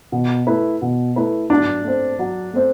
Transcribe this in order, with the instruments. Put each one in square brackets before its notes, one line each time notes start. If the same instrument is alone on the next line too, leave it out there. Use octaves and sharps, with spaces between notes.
[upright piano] B2
A3 E4 B4
B2
A3 E4 B4
[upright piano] F#3 [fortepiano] D4
[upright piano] A3 C4
F#3
A3 C4